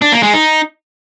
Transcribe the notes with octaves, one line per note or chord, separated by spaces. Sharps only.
D4
A#3
G#3
D#4